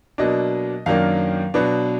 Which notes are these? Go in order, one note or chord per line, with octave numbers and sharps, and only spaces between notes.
B2 F#3 A#3 D4 D#5
F#2 D#3 F#3 A#3 D4 F5
B2 F#3 B3 D4